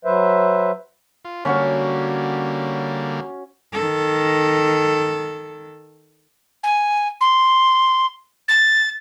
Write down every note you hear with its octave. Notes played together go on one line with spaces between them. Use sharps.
F#3 B4 C5 E5
F4
D3 G3 A#3 C#4 F#4 C#5
D#3 A4
G#5
C6
A6